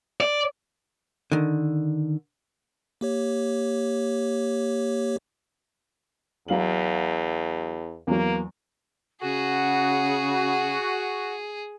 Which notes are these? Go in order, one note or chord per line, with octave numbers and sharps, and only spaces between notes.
D5
D3 D#3
A#3 G4 C#5
E2 F#3 F5 F#7
E2 F#3 A#3
C#3 F#4 G#4